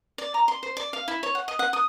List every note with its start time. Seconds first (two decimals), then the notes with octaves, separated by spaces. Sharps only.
0.18 D5
0.34 A#5
0.48 C6
0.63 C5
0.77 D5
0.93 F5
1.08 E4
1.23 C#5
1.35 F#5
1.48 D#5
1.59 F#5
1.73 D#6